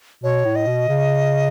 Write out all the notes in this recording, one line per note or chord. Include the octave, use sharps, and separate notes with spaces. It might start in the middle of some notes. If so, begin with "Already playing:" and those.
B2 C#5
A2
D#5
B2
C#3